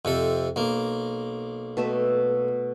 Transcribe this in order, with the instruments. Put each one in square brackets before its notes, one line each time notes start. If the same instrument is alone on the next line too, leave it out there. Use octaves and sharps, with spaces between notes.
[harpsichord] F2 C3 A4
B1 A#3
[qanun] B2 A3 E5